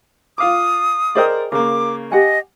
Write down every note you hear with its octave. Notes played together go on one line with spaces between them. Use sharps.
F4 F5 D6 D#6
G#4 A#4 C5 D5 D#5 G5
C#3 A#3 A#4 D6
G4 D#5 F#5 G#5